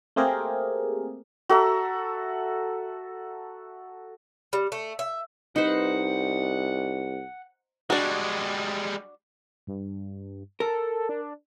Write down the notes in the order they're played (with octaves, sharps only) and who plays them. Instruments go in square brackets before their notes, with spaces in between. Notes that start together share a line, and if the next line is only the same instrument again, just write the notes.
[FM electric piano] A3 A#3 C4 G4 G#4 A#4
[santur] F#4 A4 E5 A#5
[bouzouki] G3
A3
E5
[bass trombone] C2 [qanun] D#4 B4 C5 [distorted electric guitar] F#5
[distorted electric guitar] G3 G#3 [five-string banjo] D4 F#4
[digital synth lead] G2
[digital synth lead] A4 [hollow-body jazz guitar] A#4
[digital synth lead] D4